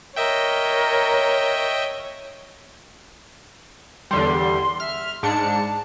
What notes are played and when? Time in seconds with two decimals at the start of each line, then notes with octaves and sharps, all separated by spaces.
0.16 A#4 C#5 D#5 E5 G5
4.11 E2 D3 G3 C6
4.80 E5 F6
5.23 G#2 D4 A5 C#7